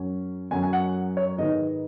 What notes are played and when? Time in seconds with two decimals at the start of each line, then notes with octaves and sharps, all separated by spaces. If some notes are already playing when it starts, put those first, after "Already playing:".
Already playing: F#2 F#3 C#4
0.51 F#2 F#3 C#4 G#5
0.63 G#5
0.73 F#5
1.17 C#5
1.38 G#2 D#3 B3 D#5